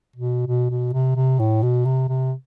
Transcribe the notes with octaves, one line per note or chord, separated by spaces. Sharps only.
B2
B2
B2
C3
C3
A2
B2
C3
C3